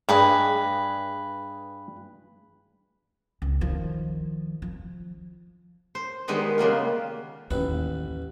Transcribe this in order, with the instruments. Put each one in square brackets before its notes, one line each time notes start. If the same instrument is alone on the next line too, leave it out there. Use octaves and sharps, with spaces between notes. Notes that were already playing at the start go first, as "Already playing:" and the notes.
[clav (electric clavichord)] G2 [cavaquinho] G#4 B4 D#5
[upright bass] C#2
D#3 F3
F3
[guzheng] C5
D#3 G3 G#3 B3 G4 D#5
C#3 A#3 B3 F4
[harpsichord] A1 B4 [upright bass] D#2